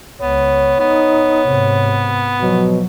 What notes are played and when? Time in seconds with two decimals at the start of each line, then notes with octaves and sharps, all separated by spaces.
0.22 C#2 B3 C#5
0.80 B3 D#4
1.47 G#2 C3
2.42 B2 F3 F#3